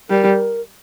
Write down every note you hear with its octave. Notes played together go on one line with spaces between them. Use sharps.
G3 A#4